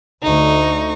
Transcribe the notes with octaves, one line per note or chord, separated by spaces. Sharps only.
D2 D#4 C#6